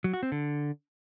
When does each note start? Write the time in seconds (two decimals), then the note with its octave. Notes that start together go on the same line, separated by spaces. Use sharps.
0.04 F#3
0.13 F#4
0.23 C4
0.32 D3